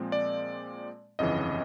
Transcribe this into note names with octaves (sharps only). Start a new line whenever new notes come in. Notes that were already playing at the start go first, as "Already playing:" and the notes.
Already playing: A#2 F3 G#3 C4
D5
G1 F2 C#3 E3 D#5